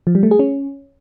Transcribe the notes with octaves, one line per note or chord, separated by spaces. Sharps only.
F3
G3
A3
G#4
C#4